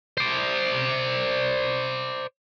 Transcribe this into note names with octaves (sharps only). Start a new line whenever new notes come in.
C5 D5